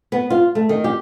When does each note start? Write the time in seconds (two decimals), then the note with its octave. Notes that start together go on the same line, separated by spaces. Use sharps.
0.12 B3
0.30 F4
0.55 A3
0.69 D#3
0.84 G4